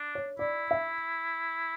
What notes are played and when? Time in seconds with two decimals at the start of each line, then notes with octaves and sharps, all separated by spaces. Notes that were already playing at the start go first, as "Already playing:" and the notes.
Already playing: D4
0.15 C#5
0.39 E4 D5
0.71 E5